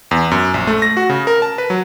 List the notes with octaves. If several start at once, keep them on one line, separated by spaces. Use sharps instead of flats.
E2
F#2
A#1
A3
A#6
F#4
C#3
A#4
A5
B4
F#3